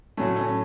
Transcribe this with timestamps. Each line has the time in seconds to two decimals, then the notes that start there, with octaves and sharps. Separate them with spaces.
0.17 A2 F#3 A3 C#4
0.36 C#4